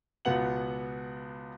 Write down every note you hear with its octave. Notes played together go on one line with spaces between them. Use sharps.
C#2 B2 B3 F#5 F#7